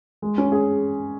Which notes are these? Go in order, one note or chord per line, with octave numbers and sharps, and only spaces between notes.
G#3
C#4
G#4